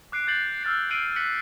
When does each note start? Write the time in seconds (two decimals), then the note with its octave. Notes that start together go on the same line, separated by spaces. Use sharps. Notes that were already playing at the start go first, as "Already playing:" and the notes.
0.12 D6 F#6 C7 D7
0.27 D6 F#6 G6 A6 C7 F#7
0.63 E6 F6 A6 C7
0.90 E6 G6 C7 D7 D#7 F#7
1.16 F#6 B6 C#7 F#7